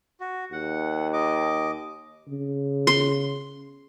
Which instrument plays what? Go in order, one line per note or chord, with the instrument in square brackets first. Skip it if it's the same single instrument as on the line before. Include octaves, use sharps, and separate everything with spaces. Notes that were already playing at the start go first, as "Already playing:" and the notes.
[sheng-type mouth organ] F#4
[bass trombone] D#2 [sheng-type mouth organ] F#5
[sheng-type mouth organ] D#5 D6
[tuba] C#3
[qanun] C6